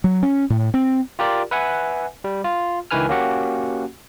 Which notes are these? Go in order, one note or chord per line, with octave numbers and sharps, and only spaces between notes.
F#3
C#4
A2
C4
F4 G4 A#4 D5
B4 E5 F#5 G#5
G3
F4
C#2 D#3 E3 B4 G#5 F6
A#3 C#4 F#4 G4 F#5